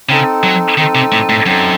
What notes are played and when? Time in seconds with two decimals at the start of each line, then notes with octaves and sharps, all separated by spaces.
0.09 C#3 C4 D#4 A4
0.43 F#3
0.77 D#3 C4 D#4 A4
0.95 C3
1.12 A2
1.29 A2
1.46 F#2 C4 D#4 A4